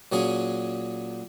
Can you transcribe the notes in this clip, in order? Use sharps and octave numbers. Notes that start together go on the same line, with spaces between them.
A#2 F#3 C#4 G#4